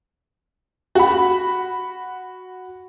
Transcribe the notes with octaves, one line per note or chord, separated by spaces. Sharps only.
F#4 B5